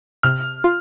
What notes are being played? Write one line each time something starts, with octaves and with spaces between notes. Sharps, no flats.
C3 F6
F4